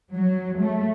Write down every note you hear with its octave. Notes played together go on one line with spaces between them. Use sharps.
F#3
A3